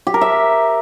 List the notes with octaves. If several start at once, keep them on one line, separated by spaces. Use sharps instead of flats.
G4
A#4
E5